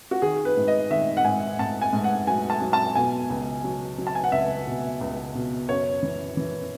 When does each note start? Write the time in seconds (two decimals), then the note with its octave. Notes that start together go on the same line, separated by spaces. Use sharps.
0.11 F#4
0.22 D#3 G#4
0.45 B4
0.57 G#2
0.68 D#5
0.91 D#3 E5
1.17 F#5
1.25 G#2 G#5
1.59 G#2 A5
1.82 G#5
1.93 G#2
2.04 F#5
2.27 F#3 G#5
2.50 A5
2.61 F#3
2.73 A5
2.96 B2 G#5
3.30 C#2
3.64 F#3
3.98 F#3
4.07 A5
4.15 G#5
4.24 F#5
4.32 C#2 E5
4.66 B2
5.01 C#2
5.34 B2
5.69 F#2 C#5
6.03 E3
6.37 E3